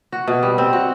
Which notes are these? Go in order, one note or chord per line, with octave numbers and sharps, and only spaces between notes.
F#4
B2
G3
C4
F#4